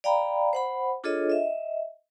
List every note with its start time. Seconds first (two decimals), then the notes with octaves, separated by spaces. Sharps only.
0.04 D5 F5 G5 A#5 B5
0.53 C5 F#5 B5
1.04 D4 F4 G#4 A4 C#5 D#5
1.30 D#5 E5